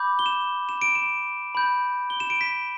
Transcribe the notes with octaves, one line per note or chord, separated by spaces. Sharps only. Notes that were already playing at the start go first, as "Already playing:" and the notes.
Already playing: B5 D6 G6
G7
E7
E7
D7
E7
B5 G6
G7
E7
D7
B6